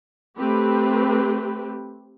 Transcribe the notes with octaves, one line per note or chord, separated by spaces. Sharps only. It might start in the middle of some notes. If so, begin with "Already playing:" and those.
A3 C4 G4 B4